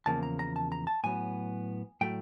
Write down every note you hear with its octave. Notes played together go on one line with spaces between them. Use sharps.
E2 C#3 F3 A#3 A5
A#5
A#5
A5
A#5
A5
A2 F#3 B3 G#5
A2 F#3 A3 G5